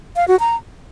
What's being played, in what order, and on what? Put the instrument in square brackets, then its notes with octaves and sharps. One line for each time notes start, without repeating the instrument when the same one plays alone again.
[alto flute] F5
F#4
A#5